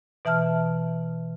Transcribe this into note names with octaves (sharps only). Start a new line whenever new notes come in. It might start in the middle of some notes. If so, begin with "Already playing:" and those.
B2 E3 E5 A5 F6